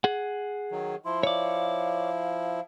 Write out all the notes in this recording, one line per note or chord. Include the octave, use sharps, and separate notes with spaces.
G#4 F#5
D#3 F#3
F3 E4 C6
C#5 D5 F5